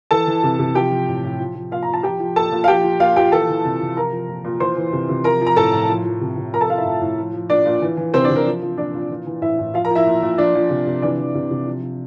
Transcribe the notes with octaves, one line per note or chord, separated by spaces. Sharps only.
E3 A4 A5
E3
C3
C3
F3 G4 G5
F3
A2
A2
F3
F3
A#2 F4 F5
A#5
A#2
A5
F3 G4 G5
F3
A#2 A4 A5
A#2
F5
F3 G4 G5
F3
A#2 F4 F5
A#2 G4 G5
E3 A4 A5
E3
C3
C3
F3 A#4 A#5
F3
A#2
A#2
E3 C5 C6
E3
C3
C3
F3 A#4 A#5
F3
A#5
A2 A4 A5
A2
F3
F3
C3
C3
F3 A#4 A#5
A4 A5
F3 F4 F5
E4 E5
A2
A2
F3
F3
A#2 D4 D5
A#2
E3
E3
C3 C4 C5
D4 D5
C3
A#4
F3
F3
A#2 D4 D5
A#2
E3
E3
A2 E4 E5
A2
F3 F4 F5
A#4 A#5
F3
E4 E5
A#2
A#2
F3 D4 D5
F3
C3
C3
E3 D4 D5
E3
C3
C3
F3
F3